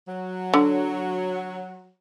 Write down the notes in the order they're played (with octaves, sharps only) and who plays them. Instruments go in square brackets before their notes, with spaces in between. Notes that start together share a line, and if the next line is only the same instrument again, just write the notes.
[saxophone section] F#3
[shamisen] D3